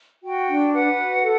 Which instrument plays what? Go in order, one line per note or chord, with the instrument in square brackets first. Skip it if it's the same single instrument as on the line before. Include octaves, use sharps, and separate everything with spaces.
[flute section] F#4 G5
D4
B4 F#5
F#4
A4